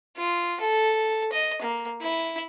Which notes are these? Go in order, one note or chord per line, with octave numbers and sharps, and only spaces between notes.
F4
A4
D#5
A#3
E4